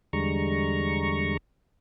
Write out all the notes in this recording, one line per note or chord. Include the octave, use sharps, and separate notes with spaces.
E2 D3 G3 G#3 A#5 C#6